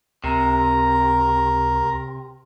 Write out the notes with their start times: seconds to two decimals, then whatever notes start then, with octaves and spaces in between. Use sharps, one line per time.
0.24 C#2 C3 A#4